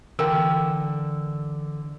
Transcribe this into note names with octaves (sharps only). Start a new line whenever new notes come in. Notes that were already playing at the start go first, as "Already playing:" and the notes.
D3 E3 A#4 G5 E6